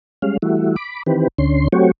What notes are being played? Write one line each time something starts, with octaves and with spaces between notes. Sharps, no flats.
G3 G#3 C#4 F5
E3 G3 A3 E4 F#4
B5 D6
D#3 E3 C4 G4 B4
D2 D3 C#4 C6
F#3 A3 C4 F#4 G4 C#5